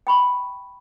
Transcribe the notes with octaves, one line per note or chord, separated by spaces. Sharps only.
G5 B5 C#6